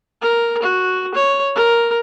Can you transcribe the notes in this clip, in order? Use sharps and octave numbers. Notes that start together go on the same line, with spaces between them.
A#4
F#4
C#5
A#4